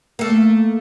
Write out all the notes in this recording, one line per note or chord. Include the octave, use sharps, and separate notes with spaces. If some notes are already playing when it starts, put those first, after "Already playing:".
A3 A#3